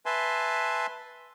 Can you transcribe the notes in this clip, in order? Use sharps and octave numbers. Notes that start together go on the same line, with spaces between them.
B4 E5 G#5 A5 C6